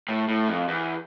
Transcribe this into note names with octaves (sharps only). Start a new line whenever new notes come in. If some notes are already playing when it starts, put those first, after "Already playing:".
A2
A2
F2
E2